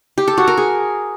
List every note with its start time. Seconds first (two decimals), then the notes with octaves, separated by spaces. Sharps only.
0.18 G4
0.28 A4
0.38 F#4
0.48 A#4
0.57 G#4